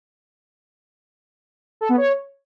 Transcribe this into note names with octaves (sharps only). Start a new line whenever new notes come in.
A4
B3
C#5